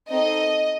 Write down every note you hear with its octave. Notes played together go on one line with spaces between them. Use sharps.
C4 D#4 A4 D#5